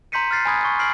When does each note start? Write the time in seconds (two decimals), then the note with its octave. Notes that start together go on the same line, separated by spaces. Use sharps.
0.12 A#5 C6 G6 B6 C#7 D#7
0.31 F6 F#6 A6 C7
0.45 G#5 A#5 B5 D#6 G#6
0.65 C#6
0.79 F6 C7 D7 F#7